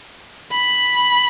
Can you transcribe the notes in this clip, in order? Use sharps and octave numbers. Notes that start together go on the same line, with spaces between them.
B5